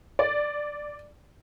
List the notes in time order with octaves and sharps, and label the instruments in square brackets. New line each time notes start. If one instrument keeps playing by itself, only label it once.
[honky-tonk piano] D5